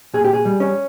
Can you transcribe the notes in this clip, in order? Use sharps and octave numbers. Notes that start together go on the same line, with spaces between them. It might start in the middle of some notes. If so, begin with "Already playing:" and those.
A#2 G#4
G4
G#4
G3
C#4